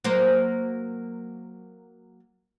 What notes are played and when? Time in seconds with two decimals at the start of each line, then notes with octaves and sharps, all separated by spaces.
0.04 F#3 A#3 C5